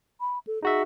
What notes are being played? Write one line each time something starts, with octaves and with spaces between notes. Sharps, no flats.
B5
A4
D#4 F#4 G#4 E5